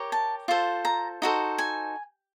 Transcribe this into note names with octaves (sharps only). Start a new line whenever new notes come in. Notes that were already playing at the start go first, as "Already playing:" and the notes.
Already playing: G4 A#4 C#5
A5
F4 A4 C5
A#5
D#4 F#4 A4 C5
G#5